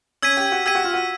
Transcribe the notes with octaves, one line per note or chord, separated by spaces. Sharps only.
C#4 E6 G#6 B6 D#7
G4
F#4
G4 E6 G#6 B6 D#7
F#4
F4
F#4